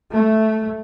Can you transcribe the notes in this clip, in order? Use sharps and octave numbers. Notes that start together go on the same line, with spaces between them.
A3